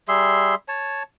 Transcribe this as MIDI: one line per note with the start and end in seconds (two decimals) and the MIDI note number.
0.08 0.55 55
0.08 0.55 68
0.08 0.55 76
0.08 0.55 84
0.68 1.03 73
0.68 1.03 81